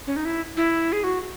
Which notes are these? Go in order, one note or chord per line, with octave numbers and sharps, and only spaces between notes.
C#4
D#4
E4
E4
G#4
F#4